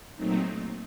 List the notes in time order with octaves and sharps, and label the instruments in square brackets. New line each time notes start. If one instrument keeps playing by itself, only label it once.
[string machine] A#2 F#3 A3 C4 D#4